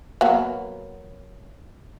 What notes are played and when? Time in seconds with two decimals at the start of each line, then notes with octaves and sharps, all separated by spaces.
0.21 F#3 A#3 B3